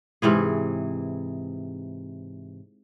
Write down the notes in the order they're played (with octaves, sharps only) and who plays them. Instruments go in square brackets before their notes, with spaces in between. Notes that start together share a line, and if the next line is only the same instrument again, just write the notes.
[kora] G#2 C3 E3 G#4